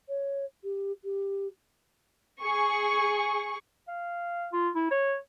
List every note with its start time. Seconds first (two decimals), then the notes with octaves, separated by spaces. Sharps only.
0.08 C#5
0.63 G4
1.04 G4
2.41 G#4 C#6
3.88 F5
4.53 F4
4.75 E4
4.91 C#5